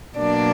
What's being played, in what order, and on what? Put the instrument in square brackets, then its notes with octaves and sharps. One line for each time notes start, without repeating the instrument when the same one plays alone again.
[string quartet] B2 F#3 A#3 D4 D5